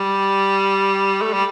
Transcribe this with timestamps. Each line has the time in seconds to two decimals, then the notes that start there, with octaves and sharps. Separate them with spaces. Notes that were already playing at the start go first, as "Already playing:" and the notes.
Already playing: G3
1.22 A3
1.33 G3